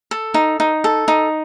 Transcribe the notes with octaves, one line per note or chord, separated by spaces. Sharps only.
A4
D#4
D#4
A4
D#4